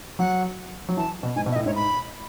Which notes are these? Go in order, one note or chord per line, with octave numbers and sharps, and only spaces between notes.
F#3 F#5
F#3
E3 A5
B2
G#2 G#5
B2
E5
A2 D#5
G#2 C#5
B5